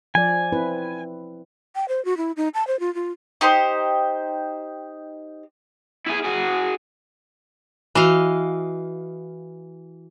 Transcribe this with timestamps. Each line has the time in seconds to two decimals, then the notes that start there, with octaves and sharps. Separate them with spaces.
0.15 F3 D5 G#5
0.52 C4 E4 B4
1.75 G5
1.89 C5
2.05 F#4
2.17 E4
2.37 D#4
2.54 A5
2.67 C5
2.80 F4
2.95 F4
3.41 D#4 G4 C5
6.07 E4 G#4
6.24 F#4 G#4
7.95 E3 F#4 D#5 F5 E6